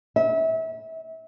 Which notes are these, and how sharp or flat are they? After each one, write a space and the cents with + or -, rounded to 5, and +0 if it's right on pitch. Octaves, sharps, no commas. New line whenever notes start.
E5 -30